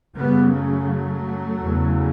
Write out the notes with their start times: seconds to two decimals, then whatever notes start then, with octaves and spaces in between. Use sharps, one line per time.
0.16 F#2 C#3 G3 B3
0.52 F#3 A3
1.61 E2 C#3